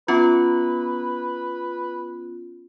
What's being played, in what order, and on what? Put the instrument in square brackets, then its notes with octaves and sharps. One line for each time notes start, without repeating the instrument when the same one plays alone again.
[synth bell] B3 C#4 F4 [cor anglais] B4